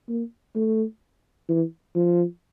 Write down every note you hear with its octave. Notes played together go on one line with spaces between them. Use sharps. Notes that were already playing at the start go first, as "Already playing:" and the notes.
A#3
A3
E3
F3